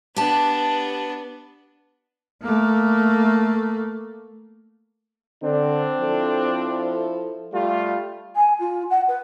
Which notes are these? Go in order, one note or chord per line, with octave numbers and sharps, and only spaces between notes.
B3 D4 G4 A5
A3 A#3
D3 C4 D4
F3 E4 A4
G3 A3 F4
G#5
F4
F#5
B4